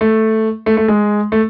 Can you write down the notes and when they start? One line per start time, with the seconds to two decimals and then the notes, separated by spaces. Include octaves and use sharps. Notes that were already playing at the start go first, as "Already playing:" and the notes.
0.01 A3
0.66 A3
0.77 A3
0.88 G#3
1.32 A3